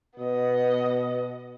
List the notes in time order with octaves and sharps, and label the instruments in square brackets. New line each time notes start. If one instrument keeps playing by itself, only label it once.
[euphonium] B2 [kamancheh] B3 D#5